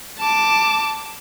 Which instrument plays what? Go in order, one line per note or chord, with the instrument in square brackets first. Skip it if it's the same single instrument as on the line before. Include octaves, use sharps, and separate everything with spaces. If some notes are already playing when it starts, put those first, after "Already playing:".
[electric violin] A5 D6